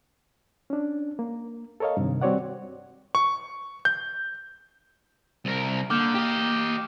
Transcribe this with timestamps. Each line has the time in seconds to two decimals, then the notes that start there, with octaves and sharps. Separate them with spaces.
0.70 C#4 D4
1.19 A#3
1.80 A4 A#4 C#5 D#5 F5
1.97 G2 C3 D#3
2.21 G3 C4 F#4 C#5 D5 F#5
3.15 C#6
3.85 G6
5.45 C2 A#4
5.90 D3 A#3 D6 F6 G6
6.15 G4 D#5